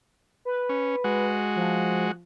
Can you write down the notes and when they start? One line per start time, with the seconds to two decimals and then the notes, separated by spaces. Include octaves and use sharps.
0.45 B4
0.69 C#4
1.04 G#3 F#4
1.56 F3